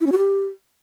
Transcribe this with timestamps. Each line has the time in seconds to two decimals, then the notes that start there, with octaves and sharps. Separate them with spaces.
0.01 E4
0.06 C#4
0.12 F#4
0.18 G4